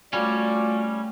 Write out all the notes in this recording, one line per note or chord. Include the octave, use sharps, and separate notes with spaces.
G3 A3 C#4 F4 F#4 D5